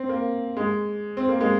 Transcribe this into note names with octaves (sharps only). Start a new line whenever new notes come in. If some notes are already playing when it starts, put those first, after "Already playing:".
Already playing: C4
A#3
G#3
C4
A#3
G#3